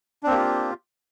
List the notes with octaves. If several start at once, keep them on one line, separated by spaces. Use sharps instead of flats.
A#3 C4 D4 F4 G4